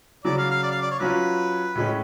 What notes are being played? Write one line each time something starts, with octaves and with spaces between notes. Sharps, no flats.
C#3 F#3 C#4 D5
F5
F5
D5
F5
D5
C#5
F#3 C#4 F4 B4
A2 G#3 C#4